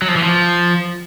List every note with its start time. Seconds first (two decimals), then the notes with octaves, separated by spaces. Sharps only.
0.02 F#3
0.08 F3
0.16 E3
0.23 F3